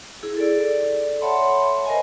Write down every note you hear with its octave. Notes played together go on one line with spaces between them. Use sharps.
E4 G#4
A4 D5
C#5 E5 F#5 A5 B5 C6
A#4 C5 D#5 G#5